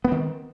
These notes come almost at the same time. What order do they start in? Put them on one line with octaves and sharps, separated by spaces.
B3 C4 D#3